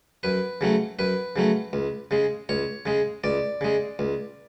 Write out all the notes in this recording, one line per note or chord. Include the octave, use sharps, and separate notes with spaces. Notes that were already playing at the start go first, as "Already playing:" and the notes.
F#2 B4
C#3 F#3 A3
F#2 B4
C#3 F#3 A3
C#2
C#3 G#3
C#2 C#5
C#3 G#3
C#2 D5
C#3 G#3
C#2